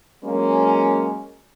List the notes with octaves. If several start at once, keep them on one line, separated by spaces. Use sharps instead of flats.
F#3 G#3 A#3 C#4